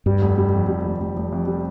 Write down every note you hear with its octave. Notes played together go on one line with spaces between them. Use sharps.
G2 G3
F1
G3
F2
G3
F1
F1
F1
F2
G3